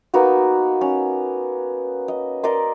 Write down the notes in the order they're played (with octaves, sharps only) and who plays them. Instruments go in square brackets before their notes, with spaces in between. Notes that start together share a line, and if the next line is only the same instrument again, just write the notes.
[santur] A#3 B3 D#4 F#4
C#4
D#5
A#4 D5 D#5 C6